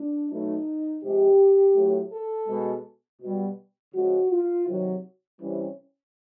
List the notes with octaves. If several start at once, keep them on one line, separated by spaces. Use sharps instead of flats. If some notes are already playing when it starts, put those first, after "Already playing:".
Already playing: D4
B2 F#3 A3 D#4
C3 F3 G#3 G4
A2 F#3 A3
A4
B2 G#3
B2 G3
C#3 F3 G#3 F#4
F4
C3 D#3 F#3
C3 E3 G3 C#4